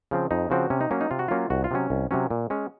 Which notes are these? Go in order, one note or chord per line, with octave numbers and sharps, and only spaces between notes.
C#3 F3 C4
F2 D#4
C#3 F3 C4 F#4
C3 C#4
D#4
F#3 A#3 C#4
D#4
C3 F4
F#4
F#3 A#3 C#4 F4
C2 F#4
F4
C3 F#3 C#4
C2
C3 F#3 C#4
A#2
G#3 C#4